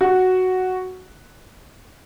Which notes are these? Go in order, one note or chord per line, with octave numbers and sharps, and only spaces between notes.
F#4